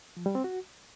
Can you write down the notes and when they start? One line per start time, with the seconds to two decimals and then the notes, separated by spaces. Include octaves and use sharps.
0.17 F3
0.26 G3
0.35 C4
0.44 F#4